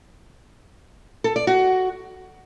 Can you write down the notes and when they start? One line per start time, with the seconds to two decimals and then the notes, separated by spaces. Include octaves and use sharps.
1.24 A4
1.36 D5
1.47 F#4